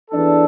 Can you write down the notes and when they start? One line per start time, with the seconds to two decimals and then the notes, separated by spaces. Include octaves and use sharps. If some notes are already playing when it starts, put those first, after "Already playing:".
0.11 E2 E3 D4 A4